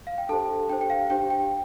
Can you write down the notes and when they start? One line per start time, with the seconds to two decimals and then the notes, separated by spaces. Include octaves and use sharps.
0.07 F5
0.18 G5
0.29 D4 G4 A4 C5 A5
0.69 D4 G4 C5 G5
0.81 G5
0.90 F5
1.10 D4 G4 C5 G5
1.30 G5